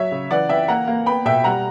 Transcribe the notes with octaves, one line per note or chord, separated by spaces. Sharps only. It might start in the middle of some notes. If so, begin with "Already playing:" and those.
Already playing: F#3 C#5 E5
C#3
E3 D5 F#5
E3 E5 G5
A#3 F#5 A#5
A#3
B3 G5 B5
B2 E5 G5
G3 F#5 A#5